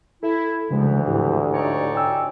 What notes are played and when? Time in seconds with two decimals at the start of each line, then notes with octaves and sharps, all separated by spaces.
0.23 E4 A4
0.71 D2 C#3 E3 F3 G#3
1.07 G#2 E4 G4
1.54 D#4 C#5 D5
1.95 G5 G#5 E6